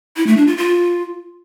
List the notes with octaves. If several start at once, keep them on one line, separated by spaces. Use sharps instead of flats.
E4
A3
D4
F4
F4